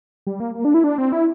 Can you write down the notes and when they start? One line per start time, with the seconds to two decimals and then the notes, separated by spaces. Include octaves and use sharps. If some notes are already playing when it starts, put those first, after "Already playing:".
0.27 G3
0.40 A#3
0.55 A#3
0.65 D4
0.74 E4
0.84 D4
0.98 C4
1.12 E4